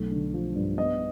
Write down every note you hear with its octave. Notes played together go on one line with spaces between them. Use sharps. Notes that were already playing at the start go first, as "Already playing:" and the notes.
Already playing: B1 A3
D3
F3
G2
B3 D#5